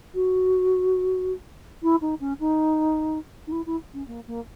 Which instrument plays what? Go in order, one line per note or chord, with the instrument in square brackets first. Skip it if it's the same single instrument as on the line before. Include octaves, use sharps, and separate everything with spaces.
[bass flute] F#4
E4
D#4
C#4
D#4
D#4
E4
E4
C#4
A#3
A#3